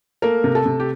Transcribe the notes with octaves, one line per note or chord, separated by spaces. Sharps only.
A3 A#3 A#4
C3
A3 A4
C3
G4